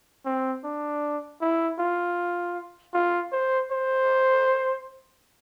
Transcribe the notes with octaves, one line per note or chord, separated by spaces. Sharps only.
C4
D4
E4
F4
F4
C5
C5